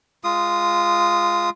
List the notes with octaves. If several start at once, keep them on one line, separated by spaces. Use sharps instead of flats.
G#3 F4 D#6